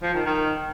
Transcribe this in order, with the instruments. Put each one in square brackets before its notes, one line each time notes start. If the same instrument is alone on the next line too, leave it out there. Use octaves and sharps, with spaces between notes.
[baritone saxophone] F3
D#3
D#3